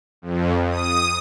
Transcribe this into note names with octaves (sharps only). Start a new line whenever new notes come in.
F2
D#6